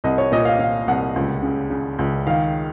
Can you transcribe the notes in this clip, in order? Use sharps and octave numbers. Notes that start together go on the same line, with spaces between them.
C2 D#5
C#5
A#2 D#5
F5
A#2 F5
C2 F#5
C#2
C#3
C#3
C#2
D#3 F5